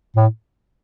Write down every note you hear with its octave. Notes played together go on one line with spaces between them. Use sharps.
A2